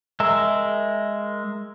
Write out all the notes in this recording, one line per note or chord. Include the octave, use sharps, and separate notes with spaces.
G#3 A#4 E5